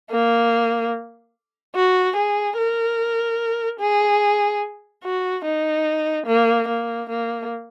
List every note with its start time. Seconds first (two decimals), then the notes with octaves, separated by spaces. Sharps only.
0.11 A#3
1.75 F#4
2.16 G#4
2.57 A#4
3.80 G#4
5.04 F#4
5.45 D#4
6.26 A#3
6.68 A#3
7.09 A#3